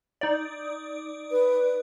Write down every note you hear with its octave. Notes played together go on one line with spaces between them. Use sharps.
D#4 D5
B4